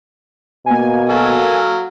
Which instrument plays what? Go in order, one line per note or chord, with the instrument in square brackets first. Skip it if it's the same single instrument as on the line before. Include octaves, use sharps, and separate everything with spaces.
[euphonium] B2 [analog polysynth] A#3 G#5
[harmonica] F#3 A4 F5